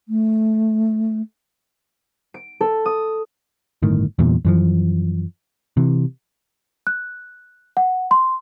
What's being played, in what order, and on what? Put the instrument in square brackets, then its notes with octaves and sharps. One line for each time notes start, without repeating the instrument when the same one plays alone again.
[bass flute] A3
[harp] D7
A4
D#6
[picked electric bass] G1 A2 D#3
E2 G2 A#2
F#2 E3 F3
C3 E3
[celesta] F#6
F#5
C6